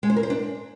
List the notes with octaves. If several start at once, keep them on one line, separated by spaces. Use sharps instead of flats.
G#3
C5
A#4
C5
D4